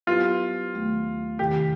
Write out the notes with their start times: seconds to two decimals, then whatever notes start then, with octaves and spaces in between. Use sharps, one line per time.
0.07 F#3 B3 E4 F4 G4 B4
0.74 D#2 D#3 F#3 A3
1.38 E2 C3 D#3 G4